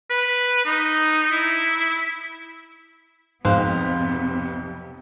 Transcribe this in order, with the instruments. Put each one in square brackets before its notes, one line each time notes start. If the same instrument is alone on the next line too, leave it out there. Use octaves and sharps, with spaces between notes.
[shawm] B4
D#4
E4
[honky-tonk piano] B1 F2 [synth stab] G#2 F5 F#6 [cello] C3 B3 [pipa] C5